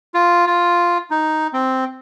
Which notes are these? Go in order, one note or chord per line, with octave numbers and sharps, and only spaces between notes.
F4
F4
D#4
C4